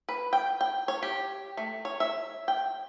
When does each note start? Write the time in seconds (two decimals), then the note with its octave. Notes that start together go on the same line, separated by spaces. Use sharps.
0.09 B4
0.33 G5
0.61 G5
0.88 C#5
1.03 G4
1.57 A3
1.85 C#5
2.00 E5
2.48 G5